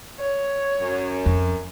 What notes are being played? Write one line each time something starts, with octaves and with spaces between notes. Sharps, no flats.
C#5
F#2
F2